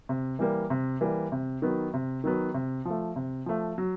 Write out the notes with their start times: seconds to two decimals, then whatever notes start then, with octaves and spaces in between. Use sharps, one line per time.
0.09 C3
0.39 E3 G3 A#3
0.70 C3
1.01 E3 G3 A#3
1.32 C3
1.62 D#3 F#3 B3
1.94 C3
2.24 D#3 F#3 B3
2.54 C3
2.85 F3 A3
3.16 C3
3.46 F3 A3
3.78 F#3